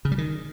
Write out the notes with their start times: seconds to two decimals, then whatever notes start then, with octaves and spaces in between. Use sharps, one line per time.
0.05 C#3
0.12 G3
0.18 D#3